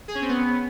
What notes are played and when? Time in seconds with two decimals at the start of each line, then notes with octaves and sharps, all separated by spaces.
0.08 G#4
0.15 C#4
0.22 C4
0.29 B3